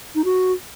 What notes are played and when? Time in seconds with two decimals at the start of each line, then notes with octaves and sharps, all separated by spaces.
0.15 D#4
0.24 F#4